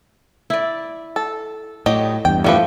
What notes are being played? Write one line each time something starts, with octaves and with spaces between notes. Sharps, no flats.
E4 D5
A4
A2 F#3 G4 D#5
E2 G2 G5
A2 F3 G3 A3 B4 G5